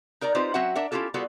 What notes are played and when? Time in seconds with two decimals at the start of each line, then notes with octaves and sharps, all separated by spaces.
0.21 D#4 A#4 D5 A#5
0.35 C4 D#4 F4 G4 B4 C5
0.54 F#3 C4 C#4 F#4 E5 F#5
0.75 D4 A#4 E5 F#5
0.92 C#4 E4 F4 G4 A4
1.14 G3 B3 F4 F#4 G#4 A4